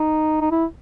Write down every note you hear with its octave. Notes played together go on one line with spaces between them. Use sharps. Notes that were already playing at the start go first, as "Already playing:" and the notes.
Already playing: D#4
D#4
E4